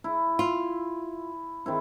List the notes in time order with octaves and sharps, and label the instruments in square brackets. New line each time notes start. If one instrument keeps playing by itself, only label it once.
[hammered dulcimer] E4
[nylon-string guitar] F4
[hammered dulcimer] D#3 C4 E4